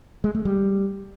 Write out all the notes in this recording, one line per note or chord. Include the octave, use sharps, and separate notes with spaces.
G#3
A3
G3